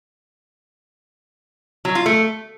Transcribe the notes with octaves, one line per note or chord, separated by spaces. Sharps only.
F#3
F4
A3